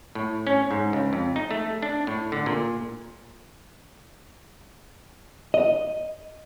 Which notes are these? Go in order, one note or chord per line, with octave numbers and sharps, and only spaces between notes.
A2
C#4
G#2
C#2
F2
D#4
A3
D4
A2
D3
A#2
D#5